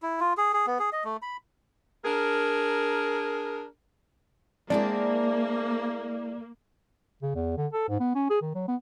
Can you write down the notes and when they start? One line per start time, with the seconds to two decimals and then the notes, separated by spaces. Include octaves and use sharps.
0.02 E4
0.20 F4
0.37 G#4
0.53 G#4
0.67 B3
0.79 G#4
0.93 D#5
1.04 A3
1.22 B5
2.05 D4 G#4 A#4
4.70 G#3 A#3 C4 D4 E4 G#4 D5
7.23 C#3
7.35 E2
7.57 D3
7.73 A4
7.89 G#2
8.00 B3
8.15 C#4
8.30 G#4
8.42 D#3
8.55 F#3
8.68 B3